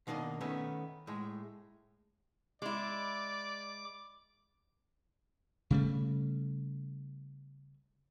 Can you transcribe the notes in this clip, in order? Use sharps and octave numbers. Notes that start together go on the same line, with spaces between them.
B2 D#3 A#3 D4 D#5
D#3 A3 B3 C#4
A2 G#3
G#3 E4 D5 D6
C#3 G3 A3